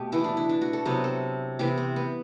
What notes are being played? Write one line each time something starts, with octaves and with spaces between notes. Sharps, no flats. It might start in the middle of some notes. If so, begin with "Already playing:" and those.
Already playing: B2 A3 G4
E3 B3 E4
D4
E4
D4
F#4
A4
C3 F#3 B3 C5
A4
C3 E3 B3 G4
C4
B3